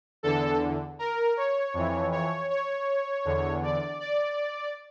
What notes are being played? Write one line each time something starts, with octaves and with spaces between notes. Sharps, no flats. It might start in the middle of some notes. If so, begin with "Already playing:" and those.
E2 D3 A4
A#4
C#5
F2 E3
C#5
C#5
E2 D3
D5
D5